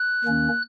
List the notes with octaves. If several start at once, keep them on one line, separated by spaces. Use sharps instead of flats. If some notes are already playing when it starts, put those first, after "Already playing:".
Already playing: F#6
D#2 D#3 A#3 C#4